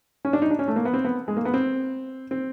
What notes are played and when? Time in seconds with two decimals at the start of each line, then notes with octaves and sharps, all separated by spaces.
0.25 C#4
0.33 D4
0.42 D#4
0.51 D4
0.59 C#4
0.68 A3
0.76 A#3
0.85 B3
0.94 C4
1.05 B3
1.28 G#3
1.37 A#3
1.45 B3
1.54 C4
2.31 C4